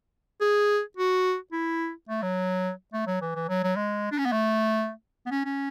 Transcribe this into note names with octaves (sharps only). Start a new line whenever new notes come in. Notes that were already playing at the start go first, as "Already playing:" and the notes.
G#4
F#4
E4
A3
F#3
A3
F#3
E3
E3
F#3
F#3
G#3
D4
C#4
B3
A3
B3
C#4
C#4